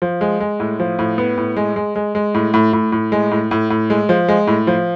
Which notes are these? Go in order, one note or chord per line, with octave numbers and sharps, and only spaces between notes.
F3
G#3
G#3
A2
F3
A2
B3
A2
G#3
G#3
G#3
G#3
A2
A2
A2
A2
G#3
A2
A2
A2
G#3
F3
G#3
A2
F3